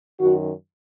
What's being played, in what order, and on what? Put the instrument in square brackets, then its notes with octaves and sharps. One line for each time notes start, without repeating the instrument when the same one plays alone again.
[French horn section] F#2 D#3 F#4